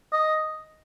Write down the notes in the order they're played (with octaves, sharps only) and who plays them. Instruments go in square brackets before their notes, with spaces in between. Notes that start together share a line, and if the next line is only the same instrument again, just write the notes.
[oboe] D#5